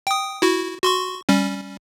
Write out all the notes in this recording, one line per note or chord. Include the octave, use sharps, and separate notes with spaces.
G5 D#6
E4 F#4
F#4 C6 C#6
G3 C#4